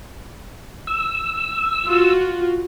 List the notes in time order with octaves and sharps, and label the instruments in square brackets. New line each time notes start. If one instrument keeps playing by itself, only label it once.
[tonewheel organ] E6
[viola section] F4 F#4